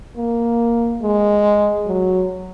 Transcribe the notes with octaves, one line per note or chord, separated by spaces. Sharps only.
A#3
G#3
F#3